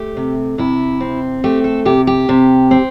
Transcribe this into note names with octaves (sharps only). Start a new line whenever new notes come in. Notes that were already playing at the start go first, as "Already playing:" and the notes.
Already playing: A3 G4
C3
C3 E4
C4
A3 G4
A4
C3 G4
G4
C3
C4